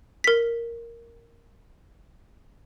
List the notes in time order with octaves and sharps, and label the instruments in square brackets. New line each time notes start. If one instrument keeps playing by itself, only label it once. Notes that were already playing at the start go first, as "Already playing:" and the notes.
[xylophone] A#4 B6